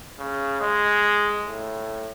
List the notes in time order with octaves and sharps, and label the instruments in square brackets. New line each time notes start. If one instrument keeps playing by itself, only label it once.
[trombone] C#3
G#3
A2